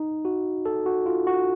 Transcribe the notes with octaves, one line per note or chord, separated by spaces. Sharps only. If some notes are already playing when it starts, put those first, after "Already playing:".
Already playing: D#4
F#4
A4
F#4
F4
F#4